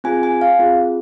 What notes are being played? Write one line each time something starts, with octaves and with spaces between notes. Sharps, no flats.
C4 F4 G#4 G#5
G#5
F5
C4 F4 G#4